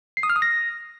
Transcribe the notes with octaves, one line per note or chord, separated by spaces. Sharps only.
C7
D#6
F6
D#6
A#6